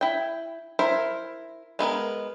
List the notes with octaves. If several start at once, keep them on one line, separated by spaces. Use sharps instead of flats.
E4 G5
E4 A#4 C5
G#3 B3 A4 A#4